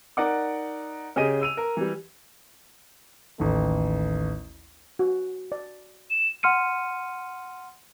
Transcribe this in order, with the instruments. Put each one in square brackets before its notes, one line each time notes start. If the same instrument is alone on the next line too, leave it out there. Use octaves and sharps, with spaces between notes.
[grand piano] D#4 A#4 D5 F#5 D6
C#3 G4 G#4 D#5 D#7
E6 D#7 F7
A#4
E3 G3
A1 D#2 A3
[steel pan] F#4
D5
[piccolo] E7
[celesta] F#5 C6 F6 C#7 D#7